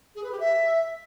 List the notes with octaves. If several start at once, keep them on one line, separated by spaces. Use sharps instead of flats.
G#4
B4
G4
E5